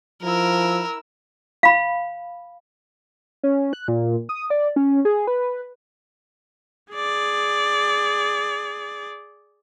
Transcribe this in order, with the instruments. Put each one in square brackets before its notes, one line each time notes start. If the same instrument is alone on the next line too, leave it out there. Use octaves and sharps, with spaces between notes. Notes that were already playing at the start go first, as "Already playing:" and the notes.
[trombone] F3 [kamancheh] E4 E6 [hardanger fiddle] A#4
[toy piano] F5 B5
[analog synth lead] C#4
F#6
A#2
D#6
D5
C#4
G#4
B4
[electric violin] G#4 D5